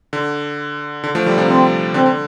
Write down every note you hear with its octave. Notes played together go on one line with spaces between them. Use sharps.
D3
D3
F3 A3
D3 G3
C3 F3
C4
D3 C4
D3